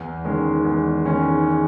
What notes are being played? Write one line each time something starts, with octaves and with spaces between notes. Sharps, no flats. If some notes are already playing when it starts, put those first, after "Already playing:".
Already playing: E2
D#3 G#3 C#4
E2
D#3 G#3 C#4